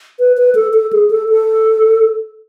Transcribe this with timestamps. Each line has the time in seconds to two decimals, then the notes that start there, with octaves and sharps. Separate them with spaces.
0.20 B4
0.37 B4
0.55 A4
0.74 A4
0.93 G#4
1.10 A4
1.30 A4